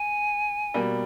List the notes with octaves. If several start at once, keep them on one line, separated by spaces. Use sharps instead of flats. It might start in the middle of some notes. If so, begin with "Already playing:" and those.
Already playing: G#5
B2 G3 A#3